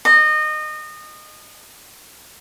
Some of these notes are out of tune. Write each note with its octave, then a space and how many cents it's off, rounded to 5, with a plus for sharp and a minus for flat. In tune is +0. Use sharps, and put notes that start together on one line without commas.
D#5 -25